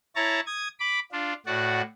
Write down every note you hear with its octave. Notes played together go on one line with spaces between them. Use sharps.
E4 C#5 A5 A#5
D#6 G#6
B5 D6
D4 F4
A2 F#4 D5 F#5